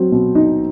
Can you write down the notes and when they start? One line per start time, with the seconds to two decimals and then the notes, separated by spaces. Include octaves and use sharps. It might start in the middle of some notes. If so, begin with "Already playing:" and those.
Already playing: F#3 C4
0.12 B2
0.35 D#4